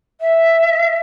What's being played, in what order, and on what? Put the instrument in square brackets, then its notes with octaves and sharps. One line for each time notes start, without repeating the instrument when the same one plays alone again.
[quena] E5